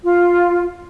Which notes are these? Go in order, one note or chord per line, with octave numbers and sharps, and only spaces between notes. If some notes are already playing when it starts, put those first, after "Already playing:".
F4